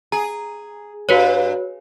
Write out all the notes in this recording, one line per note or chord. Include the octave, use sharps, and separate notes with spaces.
G#4 A#5
G2 F#4 B4 C#5